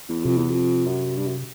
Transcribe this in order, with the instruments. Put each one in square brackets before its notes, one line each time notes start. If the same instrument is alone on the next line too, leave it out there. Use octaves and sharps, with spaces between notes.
[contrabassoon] E2
[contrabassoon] F2 [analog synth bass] C3
[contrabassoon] E2
F2
F#2
G2
F#2